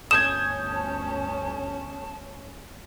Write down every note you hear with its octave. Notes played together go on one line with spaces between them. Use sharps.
G1 D2 C#4 A5 D#6 G6 G#6 E7